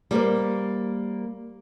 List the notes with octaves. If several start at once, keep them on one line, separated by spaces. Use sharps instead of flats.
G3 A#3 A#4 C5